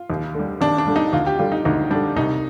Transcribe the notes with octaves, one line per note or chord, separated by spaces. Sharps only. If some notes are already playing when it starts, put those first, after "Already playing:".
Already playing: F4
D#2
D3 G3
D#2 D4
D4
D3 G3
D#4
D2 F4
G4
D3 G3 F4
D#4
D2 D#4
D3 G3 D4
C2 D#4